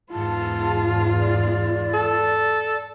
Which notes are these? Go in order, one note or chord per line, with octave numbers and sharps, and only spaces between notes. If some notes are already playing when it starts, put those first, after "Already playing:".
E2 G#2 F4 A5
D5
A4